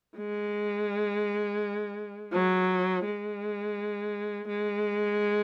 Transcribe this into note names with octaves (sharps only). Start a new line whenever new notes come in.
G#3
F#3
G#3
G#3